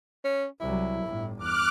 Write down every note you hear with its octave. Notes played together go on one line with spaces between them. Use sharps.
C#4
C2 F#3 E4
G1 A2
E2 D6 F6 F#6